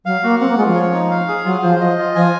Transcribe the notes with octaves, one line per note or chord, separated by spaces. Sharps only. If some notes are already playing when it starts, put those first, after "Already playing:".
F#3 F5
A#3 F#4
C4 F#5
A#3
G#3 F4
F3
C#5
D#4
F5
G#4
F#3 F4
F3 C5
F3 D#5
F4
F3 G#5